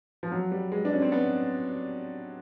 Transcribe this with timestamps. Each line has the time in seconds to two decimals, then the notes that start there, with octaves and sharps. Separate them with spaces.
0.23 F3
0.32 F#3
0.52 G3
0.72 G#3
0.85 D4
0.93 C#4
1.02 C4
1.12 B3